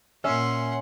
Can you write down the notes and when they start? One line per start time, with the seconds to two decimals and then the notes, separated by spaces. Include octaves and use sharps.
0.24 A#2 C#4 E5 F#5 C6